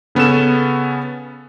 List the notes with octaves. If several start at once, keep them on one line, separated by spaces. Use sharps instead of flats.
C#3 B3 C#4 A4 E7